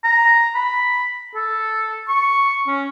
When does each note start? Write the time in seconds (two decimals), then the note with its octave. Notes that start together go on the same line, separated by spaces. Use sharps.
0.04 A#5
0.55 B5
1.35 A4
2.08 C#6
2.67 C#4